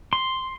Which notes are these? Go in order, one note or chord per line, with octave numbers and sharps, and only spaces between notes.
C6